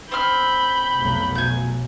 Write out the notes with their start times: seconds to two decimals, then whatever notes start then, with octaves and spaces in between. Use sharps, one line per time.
0.12 C4 B5 F6 G6
0.96 F1 B1 F#3
1.35 G#5 G6